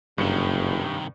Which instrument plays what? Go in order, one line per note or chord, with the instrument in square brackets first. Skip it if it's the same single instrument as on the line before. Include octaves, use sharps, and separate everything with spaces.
[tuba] F#1 [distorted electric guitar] C2 D#3 [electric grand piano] G2 C#7